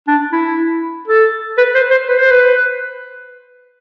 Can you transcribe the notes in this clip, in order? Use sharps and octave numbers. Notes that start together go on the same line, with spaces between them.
D4
E4
A4
B4
C5
C5
B4
C5
B4